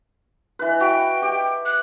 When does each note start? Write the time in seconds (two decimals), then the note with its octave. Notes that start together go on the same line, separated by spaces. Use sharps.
0.59 E3 B4
0.81 F#4 G5
1.22 G4
1.66 F#6